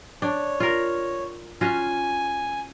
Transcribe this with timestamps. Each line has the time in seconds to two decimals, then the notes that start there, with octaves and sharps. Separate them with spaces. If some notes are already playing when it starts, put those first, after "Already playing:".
0.22 D4 C#5
0.60 F4 A#4
1.61 C#4 F4 F#4 G#5